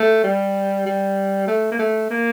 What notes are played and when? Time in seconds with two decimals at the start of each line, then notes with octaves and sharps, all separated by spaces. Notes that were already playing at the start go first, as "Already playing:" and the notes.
Already playing: A3
0.24 G3
0.86 G3
1.48 A3
1.72 A#3
1.79 A3
2.11 A#3